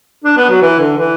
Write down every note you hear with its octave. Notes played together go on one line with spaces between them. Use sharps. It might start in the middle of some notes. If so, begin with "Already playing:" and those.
D4
B3
F#3
E3
D3
E3